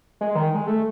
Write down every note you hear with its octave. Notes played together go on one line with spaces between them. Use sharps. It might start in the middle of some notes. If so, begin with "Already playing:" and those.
G#3
D#3
G#3
A3